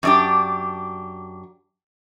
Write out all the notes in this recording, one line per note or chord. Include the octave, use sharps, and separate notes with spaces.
F#2 D4 G4